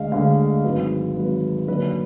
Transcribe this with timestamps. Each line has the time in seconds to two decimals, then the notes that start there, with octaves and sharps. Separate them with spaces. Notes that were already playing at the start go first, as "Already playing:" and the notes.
Already playing: D2 D3 G#3 D#5 F5
0.12 D2 D3 G#3 F5
0.64 G#1 G#2 F#3 B4
1.17 G#1 G#2 F#3 B4
1.68 F#2 D3 F#3 A#3 B4